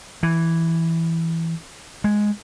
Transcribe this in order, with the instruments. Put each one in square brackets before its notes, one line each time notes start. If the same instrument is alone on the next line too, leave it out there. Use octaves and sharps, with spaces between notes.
[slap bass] E3
G#3